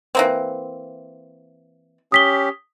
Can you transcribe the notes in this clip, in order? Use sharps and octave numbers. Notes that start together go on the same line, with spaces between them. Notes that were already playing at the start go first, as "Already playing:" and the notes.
E3 A#3 C4
C#4 G4 D#6 B6 G7